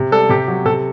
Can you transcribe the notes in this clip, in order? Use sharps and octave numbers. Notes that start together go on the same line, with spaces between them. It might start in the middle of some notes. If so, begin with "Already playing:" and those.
Already playing: C3
G3 A4
C3 G4
F#3
C3 A4